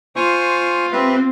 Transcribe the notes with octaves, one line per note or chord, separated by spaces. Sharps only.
F4 C5 G#5 C#6
C4 G4 B4 E5